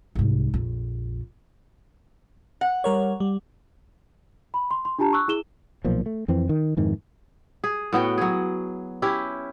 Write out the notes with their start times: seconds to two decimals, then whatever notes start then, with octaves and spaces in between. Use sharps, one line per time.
0.15 C2 G#2
0.54 A#1 F2
2.61 F#5
2.84 G3 A#4 C#5
3.20 G3
4.54 B5
4.71 C6
4.85 C6
4.99 D4 F4 G4 A5 A#5
5.13 C#6 E6 F#6
5.28 E4 G#4 E7 G7
5.85 B1 A#2 F3
6.06 A3
6.28 F2 E3 C4
6.49 D#3
6.77 F2 G#2 D#3 E3
7.64 G#4
7.93 A2 B3 F#4 G5
8.18 F#3 G#4
9.02 C#4 E4 G4